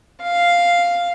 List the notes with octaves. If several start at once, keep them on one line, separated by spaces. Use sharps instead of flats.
F5